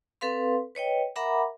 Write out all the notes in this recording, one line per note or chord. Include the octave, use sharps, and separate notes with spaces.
C4 A4 B4 F5 C6
B4 C#5 D#5 G5
A#4 E5 F#5 A#5 B5 D6